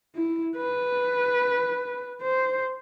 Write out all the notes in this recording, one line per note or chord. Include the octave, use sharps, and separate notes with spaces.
E4
B4
C5